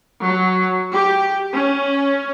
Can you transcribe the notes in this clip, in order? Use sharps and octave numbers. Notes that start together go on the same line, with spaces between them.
F#3
G4
C#4